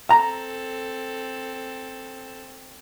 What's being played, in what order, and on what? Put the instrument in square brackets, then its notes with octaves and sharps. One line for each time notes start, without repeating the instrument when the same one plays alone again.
[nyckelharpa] C4 A4 [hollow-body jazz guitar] A#5